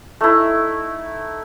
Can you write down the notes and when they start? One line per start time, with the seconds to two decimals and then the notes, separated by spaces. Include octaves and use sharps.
0.21 A3 D#4 E4